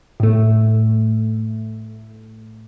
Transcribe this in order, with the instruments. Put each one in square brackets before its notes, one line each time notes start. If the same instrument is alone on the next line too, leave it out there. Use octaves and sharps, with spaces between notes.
[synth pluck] A2 A3